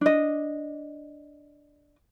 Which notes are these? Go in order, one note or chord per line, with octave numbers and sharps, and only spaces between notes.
D4 D#5